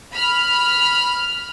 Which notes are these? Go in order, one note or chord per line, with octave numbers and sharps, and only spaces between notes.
B5 F6